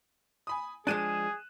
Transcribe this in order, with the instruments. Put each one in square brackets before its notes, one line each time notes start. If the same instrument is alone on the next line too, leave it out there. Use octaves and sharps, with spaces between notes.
[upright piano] G#5 B5 D#6
[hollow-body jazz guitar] F3 G#3 D4 [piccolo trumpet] G#4 [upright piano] F#6 D#7 E7